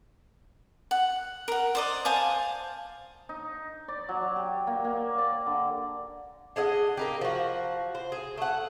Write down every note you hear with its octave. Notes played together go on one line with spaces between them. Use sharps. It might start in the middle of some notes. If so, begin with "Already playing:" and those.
F#5
A#4 F#5
C5 D5 D#5
C5 F5 G#5 A5
D#4
D5
F#3
G4
A#3
A#3
D5
D3
D4 G#4 D#5 F#5
A#3 D#4 G4
F3 F#4
C5
G#4
A3 F#5